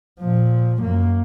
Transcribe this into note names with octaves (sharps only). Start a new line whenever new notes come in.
A#2 F3
F#2 A#3